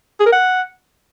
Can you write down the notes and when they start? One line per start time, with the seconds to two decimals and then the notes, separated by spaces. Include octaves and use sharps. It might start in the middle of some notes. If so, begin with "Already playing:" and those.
0.20 G#4
0.26 A#4
0.32 F#5